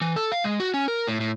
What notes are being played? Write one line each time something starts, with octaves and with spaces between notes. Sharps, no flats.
E3
A4
F5
G#3
F#4
C#4
A#4
A2
A2